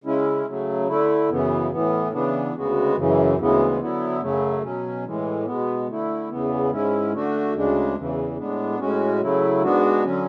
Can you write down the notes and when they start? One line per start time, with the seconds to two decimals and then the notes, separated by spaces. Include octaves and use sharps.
0.04 C#3 G#3 C#4 E4
0.46 C#3 F#3 A3
0.88 D3 A3 E4
1.29 F#2 C#3 E3 B3
1.71 A2 E3 B3
2.12 C#3 E3 B3 D4
2.54 D2 C#3 G#3 B3 F#4
2.96 F#2 C#3 E3
3.38 D2 C#3 E3 G#3 B3
3.80 D3 F#3 B3 E4
4.21 F#2 C#3 F#3 A3
4.63 B2 F#3 C#4
5.04 A2 E3 G#3
5.45 B2 G#3 B3
5.87 D3 A3 E4
6.29 E2 C#3 E3 B3
6.71 G#2 G#3 C#4 E4
7.13 D3 A3 D4 F#4
7.54 D2 C#3 G#3 D4
7.96 E2 C#3 E3
8.37 A2 G#3 B3 D4
8.79 A2 G#3 C#4 F#4
9.20 C#3 F#3 A3 E4
9.62 G#2 G#3 B3 D4 F#4
10.04 D3 F#3 C#4